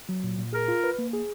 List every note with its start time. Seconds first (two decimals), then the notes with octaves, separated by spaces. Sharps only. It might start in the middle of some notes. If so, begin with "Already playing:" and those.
0.09 F#3
0.24 A#2
0.38 A#2
0.53 G#4 A#4
0.68 F4
0.84 B4
0.99 A#3
1.13 G#4